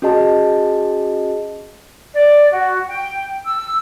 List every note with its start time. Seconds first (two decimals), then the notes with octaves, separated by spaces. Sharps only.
0.02 C#4 F#4 G#4 D#5 A5
2.14 D5
2.51 F#4
2.87 G5
3.45 E6